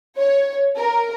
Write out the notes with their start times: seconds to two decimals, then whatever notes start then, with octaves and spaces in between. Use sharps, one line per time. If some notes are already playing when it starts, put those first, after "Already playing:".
0.17 C#5
0.78 A#4